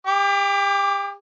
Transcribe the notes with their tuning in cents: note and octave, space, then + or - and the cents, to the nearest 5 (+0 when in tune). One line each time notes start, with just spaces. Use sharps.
G4 +35 D6 +0